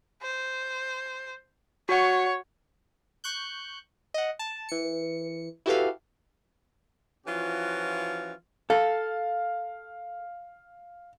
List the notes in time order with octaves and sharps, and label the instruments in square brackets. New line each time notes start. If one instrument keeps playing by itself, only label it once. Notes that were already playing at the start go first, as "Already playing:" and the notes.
[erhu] C5
[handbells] F#4 F#5 [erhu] C#5
[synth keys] C#6 F#6 G6
D#5 F#5
A5
E3 C#7
E4 F#4 G4 A4 B4 F5
[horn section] E3 F3 C#4 F4 F#4
[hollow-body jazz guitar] A4 [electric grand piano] F5